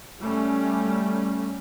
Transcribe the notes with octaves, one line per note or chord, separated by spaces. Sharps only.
G3 A3 C#4